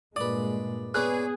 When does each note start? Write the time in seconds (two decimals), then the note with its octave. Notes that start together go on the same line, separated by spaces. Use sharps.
0.16 G2 A#2 G#3 B4 D5 D#6
0.94 B3 C#4 G#4 B4 D5 F#6